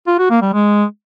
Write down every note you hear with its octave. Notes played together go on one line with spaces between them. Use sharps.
F4
F#4
A#3
G3
G#3